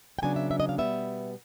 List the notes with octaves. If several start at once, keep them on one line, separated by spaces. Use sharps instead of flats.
G5
C#3 F#3 B3 D4 G#5
E5
E5
D#5
F5
B2 G3 B3 E5